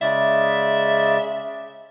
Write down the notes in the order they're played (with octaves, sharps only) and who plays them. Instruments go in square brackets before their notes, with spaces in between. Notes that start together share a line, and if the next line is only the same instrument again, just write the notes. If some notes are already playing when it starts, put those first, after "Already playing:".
[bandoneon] C#3 G#3 D5 [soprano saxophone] E5